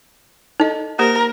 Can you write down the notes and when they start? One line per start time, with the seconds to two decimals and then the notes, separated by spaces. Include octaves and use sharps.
0.60 D#4 A4 D#5
0.99 A#3 G4 A#4 C5